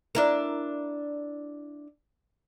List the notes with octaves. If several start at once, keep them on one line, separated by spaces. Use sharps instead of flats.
D4 E4 A#4